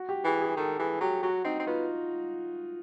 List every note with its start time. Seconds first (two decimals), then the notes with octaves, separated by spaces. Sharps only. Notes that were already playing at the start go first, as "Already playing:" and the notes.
Already playing: F#4
0.09 G4
0.24 E3 G#4
0.41 G#4
0.57 D#3 A4
0.79 E3 G#4
1.01 F#3 G4
1.23 F#3 F#4
1.44 C4 D#4
1.60 C4
1.67 B3 F4